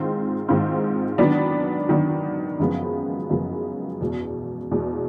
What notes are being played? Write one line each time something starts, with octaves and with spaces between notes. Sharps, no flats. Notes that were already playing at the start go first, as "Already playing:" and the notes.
Already playing: G#2 D#3 G#3 C4 F4
G#2 D#3 G#3 C4 F4
D#3 F#3 B3 D4
D#3 F#3 B3 D4
F#2 C#3 F3 G#3 B3
F#2 C#3 F3 G#3 B3
E2 B2 G#3
E2 B2 G#3